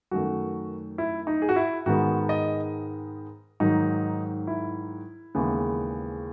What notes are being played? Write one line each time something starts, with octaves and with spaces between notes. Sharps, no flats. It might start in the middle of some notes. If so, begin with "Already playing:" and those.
F#2 D#3 A3 F#4
E4
D#4
G#4
F#4
E4
G#2 D#3 G#3 B3 F#4
D#5
G#2 D#3 F#3 D#4
E4
D#2 C#3 E3 G#3 B3